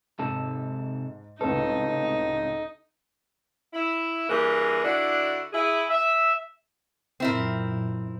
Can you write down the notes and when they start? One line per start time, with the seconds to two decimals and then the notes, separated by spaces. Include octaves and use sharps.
0.19 G#2 C3 A4
1.41 C#2 A2 C3 D#4 A4 B4
3.74 E4
4.30 G2 E3 A#3 G#4
4.84 D3 D4 E4 F#4
5.53 E4 G#4
5.90 E5
7.20 F#2 A#2 C4 E4 A#4